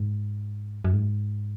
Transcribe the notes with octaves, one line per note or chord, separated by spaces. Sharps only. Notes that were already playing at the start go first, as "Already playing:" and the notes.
Already playing: G#2
F#2
G#2